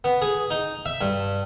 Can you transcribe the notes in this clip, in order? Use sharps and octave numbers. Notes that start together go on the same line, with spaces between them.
B3
G#4
D#4
E5
G2